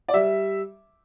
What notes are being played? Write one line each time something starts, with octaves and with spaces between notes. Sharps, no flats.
D5
G3 E5